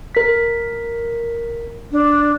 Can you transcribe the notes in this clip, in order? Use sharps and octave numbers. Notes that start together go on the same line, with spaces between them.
A#4 B6
D4